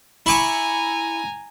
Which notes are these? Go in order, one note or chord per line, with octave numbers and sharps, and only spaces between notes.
E4 G#5 A#5 C#6 D6